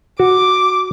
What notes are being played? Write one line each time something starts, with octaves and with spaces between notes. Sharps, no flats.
F#4 D6